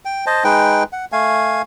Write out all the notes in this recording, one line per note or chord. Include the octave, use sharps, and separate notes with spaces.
G5
C5 D#5 A5
G#3 D#4 B4 G5
F#5
A3 F5 G#5